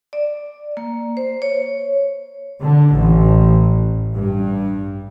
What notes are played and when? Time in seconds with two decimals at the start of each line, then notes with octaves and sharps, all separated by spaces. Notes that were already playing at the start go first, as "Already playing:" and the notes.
0.13 D5
0.77 A#3
1.17 C5
1.42 C#5
2.63 D3
2.95 A1
4.14 G2